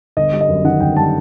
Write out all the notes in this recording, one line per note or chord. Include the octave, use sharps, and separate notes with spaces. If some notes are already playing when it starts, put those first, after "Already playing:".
G1 D#5
G3
D#5
F#2
D#3 F#5
G1 G5
G3 A5